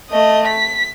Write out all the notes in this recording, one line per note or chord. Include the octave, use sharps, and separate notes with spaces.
A3 D#5
B6